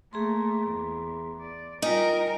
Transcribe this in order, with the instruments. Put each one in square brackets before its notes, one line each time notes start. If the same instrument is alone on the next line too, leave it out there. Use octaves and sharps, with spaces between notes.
[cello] A3 A#3 [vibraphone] G#4 A#5 C6
[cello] E2
D5
[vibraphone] G3 F4 G#5 [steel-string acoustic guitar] D#4 [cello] A#4